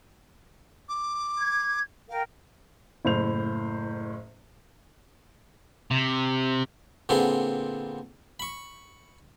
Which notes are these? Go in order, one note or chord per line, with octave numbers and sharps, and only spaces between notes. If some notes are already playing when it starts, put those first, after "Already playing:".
D6
G#6
A#4 F5 G5
F#1 A2 C5 F7
C3
A#2 D3 B3 C4 G#4
B5 C#6